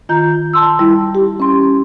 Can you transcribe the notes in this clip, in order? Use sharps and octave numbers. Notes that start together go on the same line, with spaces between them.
D#3 F4 A#5 G6
A5 C6 E6
G3 E4
G4
C#4 C6